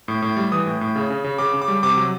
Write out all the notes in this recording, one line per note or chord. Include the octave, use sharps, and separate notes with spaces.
A2
A2
G3
E3 D#6
A2
A2
C#3
C#3
C#3
C#3 D6
C#3
D6
G3
C3 D6
F#3